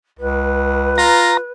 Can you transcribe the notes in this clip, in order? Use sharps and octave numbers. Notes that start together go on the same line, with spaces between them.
C#2 B4
F4 A#5